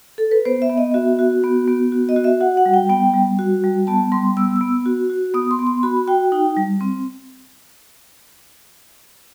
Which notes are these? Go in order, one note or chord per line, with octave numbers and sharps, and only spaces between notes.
A4
B4
B3 C5
E5
B3
D#5
F#4 E5
F#4
B3
B3
F#4
D#5
F#4
E5
F#4 F#5
F#5
G3
G5
B3 G5
G3
F#4
G3
B3 A5
G3 C6
B3 E6
E6
B3
F#4
F#4
B3 D#6
C6
B3
C6
F#4 B5
F#4 G5
D#4 G5
G3
C4